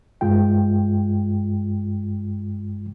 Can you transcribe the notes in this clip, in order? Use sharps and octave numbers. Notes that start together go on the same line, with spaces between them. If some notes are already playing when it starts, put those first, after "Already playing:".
G2 G#3 F4 G5